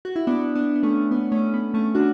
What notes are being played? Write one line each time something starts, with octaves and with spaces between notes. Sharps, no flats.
F#4
E4
B3 D4
B3 D4
B3
A3 C#4
B3
A3 C#4
B3
A3 C#4
D4 F#4